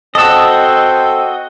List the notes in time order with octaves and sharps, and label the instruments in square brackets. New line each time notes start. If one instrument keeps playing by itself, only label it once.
[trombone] C4 [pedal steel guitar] F#4 D#5 [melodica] A4 [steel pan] A5 E6